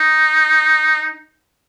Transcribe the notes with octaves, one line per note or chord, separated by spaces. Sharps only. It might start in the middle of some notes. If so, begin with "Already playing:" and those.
Already playing: D#4